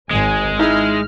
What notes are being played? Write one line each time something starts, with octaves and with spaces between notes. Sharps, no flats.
G#1 G#2 G#3 G#5
D#4 E4 G#4 F6